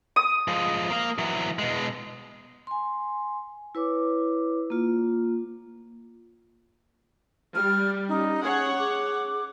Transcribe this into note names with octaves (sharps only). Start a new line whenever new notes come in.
D#6
F3 G#3
A#3 F5
E3 F#3
B2 G#3
G#5 C6
E4 B4 C#5 D6
A#3 F4
G3 F6
C#4 D#4
G#4 C#5 F#5
G#4 D6